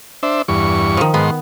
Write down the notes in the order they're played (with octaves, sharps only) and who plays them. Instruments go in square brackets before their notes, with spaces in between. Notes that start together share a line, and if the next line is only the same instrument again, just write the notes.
[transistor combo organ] D4 C5 E5
E2 G2 C#6
[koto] D#3 F3
[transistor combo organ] G#2 D#3 C6 [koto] B3